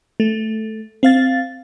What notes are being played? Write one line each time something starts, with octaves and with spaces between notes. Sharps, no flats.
A3
C4 F5 A6